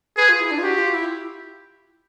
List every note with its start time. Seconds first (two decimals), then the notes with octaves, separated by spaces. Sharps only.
0.17 G#4 B4
0.29 F4
0.40 E4
0.51 D4
0.59 F4
0.63 F#4 G4
0.78 F4
0.94 E4